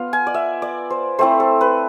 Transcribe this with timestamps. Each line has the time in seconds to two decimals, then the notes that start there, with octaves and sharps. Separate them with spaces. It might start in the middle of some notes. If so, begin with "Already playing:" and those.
Already playing: B3 F4 F5
0.13 G#5
0.27 D5
0.34 E5
0.62 D5
0.90 C5
1.19 A3 C4 E4 C5
1.40 A4
1.61 B4